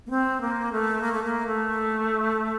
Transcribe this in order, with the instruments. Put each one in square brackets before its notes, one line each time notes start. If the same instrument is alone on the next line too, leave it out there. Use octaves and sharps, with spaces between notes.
[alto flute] A#3
C4
A#3
A3
A#3
A3
A#3
A3